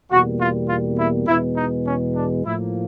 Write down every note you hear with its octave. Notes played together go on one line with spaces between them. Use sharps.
E2 B2 G3 A#3 F#4
F4
F4
E4
E2 B2 G#3 B3 E4
D#4
C#4
D4
A2 F3 A#3 E4